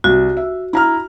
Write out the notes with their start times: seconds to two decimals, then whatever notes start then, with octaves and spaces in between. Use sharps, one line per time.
0.04 C2 F#4
0.37 E5
0.73 E4 A#5 F6